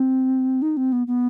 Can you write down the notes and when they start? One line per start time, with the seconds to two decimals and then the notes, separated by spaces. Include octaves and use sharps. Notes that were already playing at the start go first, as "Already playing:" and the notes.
Already playing: C4
0.62 D#4
0.77 C4
0.92 B3
1.07 B3